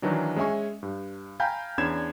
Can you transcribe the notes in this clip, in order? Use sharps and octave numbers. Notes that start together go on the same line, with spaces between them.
D#3 E3 F#3 D4
G#3 C#4 E5 G#5 C#6
G2
F5 G5 G#5 A#5 B5 G6
E2 C#4 D4 B5 G#6 E7